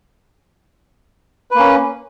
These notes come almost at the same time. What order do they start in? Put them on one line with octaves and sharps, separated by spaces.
B4 A#3 C#4